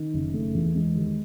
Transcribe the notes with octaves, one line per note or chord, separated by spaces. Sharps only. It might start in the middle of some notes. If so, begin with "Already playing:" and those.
Already playing: D#3
F#1
A3
E2
G#3
D#2